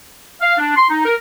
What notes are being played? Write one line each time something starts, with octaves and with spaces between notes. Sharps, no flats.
F5
D4
C6
D#4
A#4